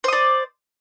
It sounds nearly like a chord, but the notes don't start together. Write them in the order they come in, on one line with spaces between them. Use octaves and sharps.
C5 D#6 D5